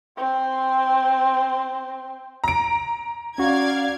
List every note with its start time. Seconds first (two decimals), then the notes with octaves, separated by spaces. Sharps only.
0.17 C4 C6
2.44 A#5 D7
3.38 C#4 F#4 D5 F5 G#6